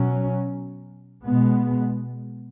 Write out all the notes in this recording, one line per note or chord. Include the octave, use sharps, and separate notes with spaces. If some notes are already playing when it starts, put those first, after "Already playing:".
Already playing: B2 F#3 C#4
B2 G#3 B3